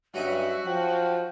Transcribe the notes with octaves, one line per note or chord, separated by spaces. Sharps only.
G2 F#3 C#4 D#4 F#4 E5
F3 G5